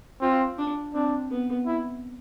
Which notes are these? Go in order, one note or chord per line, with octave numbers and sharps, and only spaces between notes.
C4 F4
D4
C4 D4
B3
E4